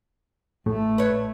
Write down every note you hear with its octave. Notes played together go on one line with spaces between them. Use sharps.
A1 A2 A3
B4 C#5